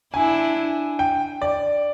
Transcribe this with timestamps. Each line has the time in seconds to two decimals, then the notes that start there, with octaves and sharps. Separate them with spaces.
0.14 D4 E4 G#5
0.99 G5
1.42 D5